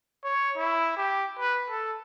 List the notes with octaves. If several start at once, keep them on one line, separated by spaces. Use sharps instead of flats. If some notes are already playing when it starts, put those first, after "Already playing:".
C#5
E4
G4
B4
A4